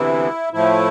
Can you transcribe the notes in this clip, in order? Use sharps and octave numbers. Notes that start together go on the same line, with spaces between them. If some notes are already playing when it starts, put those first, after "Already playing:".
Already playing: D2 C3 E3 B3 E4
A2 F3 A3 E4